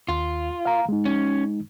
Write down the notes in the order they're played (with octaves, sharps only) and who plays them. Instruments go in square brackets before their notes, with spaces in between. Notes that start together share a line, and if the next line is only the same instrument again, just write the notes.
[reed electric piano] D#2 [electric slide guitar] F4
[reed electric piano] F5 A#5
G#3 D#4
[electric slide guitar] C#4